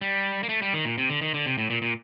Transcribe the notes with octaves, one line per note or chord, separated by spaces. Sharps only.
G3
A#3
A3
G3
D#3
A#2
C3
D3
D#3
D3
C3
A2
A#2
A#2